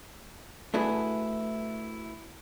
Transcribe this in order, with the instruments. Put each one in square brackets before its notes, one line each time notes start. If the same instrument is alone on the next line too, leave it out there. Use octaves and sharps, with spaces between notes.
[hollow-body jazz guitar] A3 D4 E4 F#4 G#4 B4